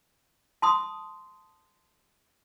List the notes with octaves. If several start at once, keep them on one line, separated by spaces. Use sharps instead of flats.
A5 C6 D#6